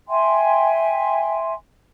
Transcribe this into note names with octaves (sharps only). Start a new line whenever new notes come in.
E5 G5 G#5 C6